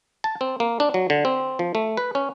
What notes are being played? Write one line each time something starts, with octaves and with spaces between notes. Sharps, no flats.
A5
C4
A#3
D4
F#3
D3
C4
F3
A3
B4
C#4